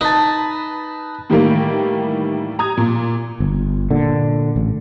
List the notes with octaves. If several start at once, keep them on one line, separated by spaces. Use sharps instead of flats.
D#4 B4 A5
A2 D#3 E3 G3 A#3
A#5 D#6 G#6
A#2
G1
A#2 D3
A1